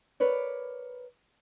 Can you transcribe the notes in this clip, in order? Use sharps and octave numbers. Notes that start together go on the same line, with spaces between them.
A#4 B4 C#5 D5